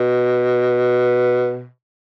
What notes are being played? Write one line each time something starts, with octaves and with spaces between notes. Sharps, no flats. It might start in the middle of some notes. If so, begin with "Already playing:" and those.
Already playing: B2